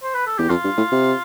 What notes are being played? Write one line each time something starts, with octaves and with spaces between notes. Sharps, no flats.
C5
B4
A4
E2 G4
F2 F4
G2
A2
C3